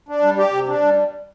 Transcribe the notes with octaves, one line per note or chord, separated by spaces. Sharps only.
D4
G3
G4
C3
D4
G3